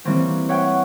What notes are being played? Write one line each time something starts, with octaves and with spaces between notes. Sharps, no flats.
E3 G3 A#3 C4 C#4
C#5 E5 F#5 G5